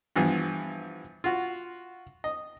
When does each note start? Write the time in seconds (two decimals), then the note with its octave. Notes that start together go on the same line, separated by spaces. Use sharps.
0.16 G2 E3 F3 B3
1.24 F4 F#4
2.24 D#5